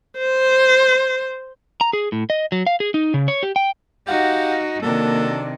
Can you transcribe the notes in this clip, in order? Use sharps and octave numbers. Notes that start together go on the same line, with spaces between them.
C5
A#5
G#4
A2
D#5
F#3
F5
G#4
D#4
C#3
C#5
G4
G5
D#4 F#4 G4 F5 F#5
C3 D#3 F#3 A#3 D4 A4